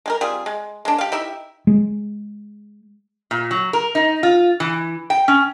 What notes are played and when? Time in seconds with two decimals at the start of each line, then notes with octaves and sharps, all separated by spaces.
0.06 G#3 G4 A#4
0.21 G3 C4 F4 G#4
0.46 G#3
0.85 G#3 D4
0.98 G4 F5
1.12 D#4 E4 G4 E5
1.67 G#3
3.31 A#2
3.51 F#3
3.73 A#4
3.95 D#4
4.23 F4
4.60 E3
5.10 G5
5.28 C#4